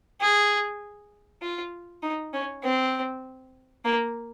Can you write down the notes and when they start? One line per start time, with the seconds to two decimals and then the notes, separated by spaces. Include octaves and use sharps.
0.21 G#4
1.42 F4
2.03 D#4
2.33 C#4
2.64 C4
3.85 A#3